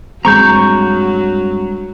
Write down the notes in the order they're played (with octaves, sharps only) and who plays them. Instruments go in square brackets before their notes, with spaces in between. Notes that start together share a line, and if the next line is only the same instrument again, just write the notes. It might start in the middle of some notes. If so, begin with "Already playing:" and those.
[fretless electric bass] G2 G#3 C4 [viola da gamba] F#3 [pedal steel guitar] A#5 C#6 G6